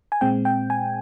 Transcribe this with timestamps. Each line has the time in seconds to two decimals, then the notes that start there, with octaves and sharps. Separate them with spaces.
0.12 G#5
0.21 A#2 G#3 C4 G5
0.45 G5
0.70 G#5